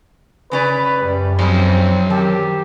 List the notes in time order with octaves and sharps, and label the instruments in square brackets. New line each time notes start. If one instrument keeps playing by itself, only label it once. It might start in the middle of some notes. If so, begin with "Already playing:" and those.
[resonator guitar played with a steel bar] C#3 C#4 D5 [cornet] B4
[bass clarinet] F#2 [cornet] G3
[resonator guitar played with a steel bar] F2 C#4 G4 [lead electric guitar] F#3 C6 [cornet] C4
[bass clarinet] D#3 [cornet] G4 [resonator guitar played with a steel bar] A5